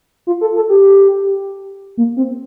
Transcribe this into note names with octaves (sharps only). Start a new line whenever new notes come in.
F4
A4
A4
G4
A#3
C4